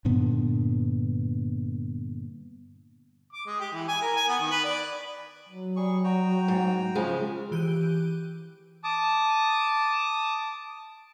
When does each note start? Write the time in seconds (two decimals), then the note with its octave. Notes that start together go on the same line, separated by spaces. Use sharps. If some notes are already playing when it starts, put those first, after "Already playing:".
0.05 G2 A#2 D3 B3
3.33 D6
3.46 G#3
3.60 G4
3.73 E3
3.88 G#5
4.01 A#4
4.17 G#5
4.28 B3
4.40 D#3
4.51 B4
4.64 D5
5.47 F#3
5.76 G3 G#4 C#6
6.04 F#4 G5 A#5
6.48 G#2
6.95 C#3 F3 G#3
7.51 E3 G4 F#6 G6 D7 D#7
8.84 A5 D6 D#6